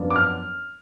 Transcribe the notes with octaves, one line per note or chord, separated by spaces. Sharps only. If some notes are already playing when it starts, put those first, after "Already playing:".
Already playing: F#2 F3 B3 D4
D6
F6